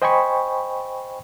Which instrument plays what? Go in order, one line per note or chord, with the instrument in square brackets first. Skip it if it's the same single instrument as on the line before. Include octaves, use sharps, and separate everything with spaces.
[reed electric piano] C5 D#5 G5 G#5 B5 C#6